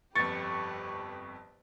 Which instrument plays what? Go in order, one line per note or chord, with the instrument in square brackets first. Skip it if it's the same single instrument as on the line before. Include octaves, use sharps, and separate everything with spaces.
[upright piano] G1 F2 [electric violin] G4 B4 [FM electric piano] C#6 [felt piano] A6